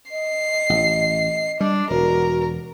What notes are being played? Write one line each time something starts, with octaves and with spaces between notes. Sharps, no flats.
D#5 C7
A1
G3 D4
E1 F#4 A#4